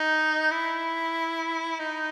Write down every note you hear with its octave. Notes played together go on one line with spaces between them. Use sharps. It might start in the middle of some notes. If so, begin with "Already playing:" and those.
Already playing: D#4
E4
D#4